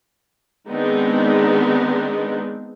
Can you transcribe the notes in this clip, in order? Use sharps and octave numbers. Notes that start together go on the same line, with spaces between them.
D#3 G#3 B3 C4 D4 D#4